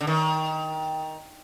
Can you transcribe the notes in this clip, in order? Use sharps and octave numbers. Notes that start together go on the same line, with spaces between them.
D3
D#3